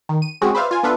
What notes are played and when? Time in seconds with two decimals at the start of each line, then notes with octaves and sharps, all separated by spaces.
0.09 D#3
0.22 D#7
0.42 G#3 C4 C#4 F#4 G#4
0.55 B4 C5 D5 E5 F5
0.71 F4 G#5
0.83 B3 D4 F4 A4 B4 E5